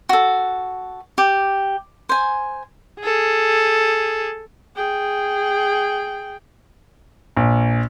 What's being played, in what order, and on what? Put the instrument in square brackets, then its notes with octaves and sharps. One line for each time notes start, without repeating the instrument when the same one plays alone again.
[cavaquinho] F#4 A4
G4
C5 G#5
[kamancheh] G#4 A4
[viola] G#4 G5
[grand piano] A#1